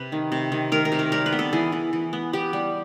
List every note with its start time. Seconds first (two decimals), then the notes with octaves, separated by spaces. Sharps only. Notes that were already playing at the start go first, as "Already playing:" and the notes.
Already playing: C3 B4
0.12 D#3
0.32 C3
0.52 D#3
0.72 D#3 A#4
0.85 A#4
0.92 C3
0.99 A#4
1.12 G3 A#4
1.26 B4
1.32 B3
1.39 A4
1.53 E3 G#4
1.72 E3
1.93 E3
2.13 B3
2.33 B3 G4
2.53 G3